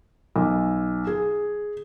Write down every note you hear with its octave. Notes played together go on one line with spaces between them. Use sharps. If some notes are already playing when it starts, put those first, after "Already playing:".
B1
G#4